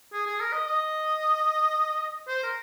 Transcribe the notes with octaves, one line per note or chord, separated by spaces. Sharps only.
G#4
G#4
A#4
D#5
D#5
C5
A#4